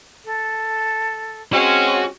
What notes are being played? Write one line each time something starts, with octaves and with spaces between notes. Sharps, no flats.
A4
G#3 C4 C#4 F#4